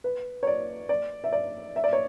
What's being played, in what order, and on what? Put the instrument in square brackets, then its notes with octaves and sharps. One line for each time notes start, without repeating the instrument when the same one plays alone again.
[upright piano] B4
C#5
D5
D5
E5
D5
E5
D5
C#5